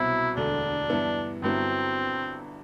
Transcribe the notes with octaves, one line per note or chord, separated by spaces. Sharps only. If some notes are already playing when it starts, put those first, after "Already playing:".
Already playing: C2 B2 F#3 C4 E4
E1 D2 D3 D4
G2 E3 B3 E4
G1 G2 F#3 B3 C4 E4